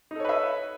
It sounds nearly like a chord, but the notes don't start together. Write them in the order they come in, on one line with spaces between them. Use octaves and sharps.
D#4 A4 C#5 B4 E5